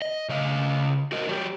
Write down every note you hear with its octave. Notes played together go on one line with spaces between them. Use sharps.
D#5
C#3 D#5 F5
F#4 A#4 D#5
F#3 G4